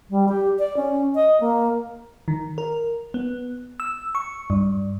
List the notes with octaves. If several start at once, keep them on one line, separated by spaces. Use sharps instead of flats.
G3
G4
D5
C#4
D#5
A#3
D#3
A#4
B3
E6
C#6
G2